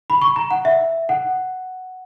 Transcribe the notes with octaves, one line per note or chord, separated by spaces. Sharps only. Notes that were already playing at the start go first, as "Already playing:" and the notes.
B5
C#6
A#5
F#5
E5
F#5